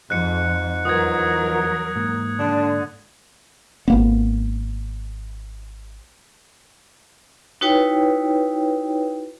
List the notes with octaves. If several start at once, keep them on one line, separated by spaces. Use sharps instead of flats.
F2 G#2 F#6 C#7
E2 F#3 F4 A#4 B4 F#5 D#6 G#6
G#2 A#3
D3 D4
G#1 A#3 B3
D#4 E4 F#4 B4 C#5 G5